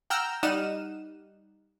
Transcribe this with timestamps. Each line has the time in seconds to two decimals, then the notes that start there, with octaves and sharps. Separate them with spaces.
0.10 F#5 G5 A#5 E6 F6 G6
0.43 G3 D#4 F#5 F6 D#7 E7